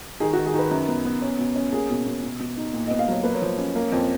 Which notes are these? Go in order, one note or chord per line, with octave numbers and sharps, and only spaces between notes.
D#3 G#4
F#4
D#3
G#4
D#3 B4
F#2
B3
B3
C#4
B2
C#4
A#3 G#4
B2
B2
B2
B2
D#4
A#2
D#5
B3
F5
F#3 C#5
A#3 B4
C#5
F3
C#4
A#3
F2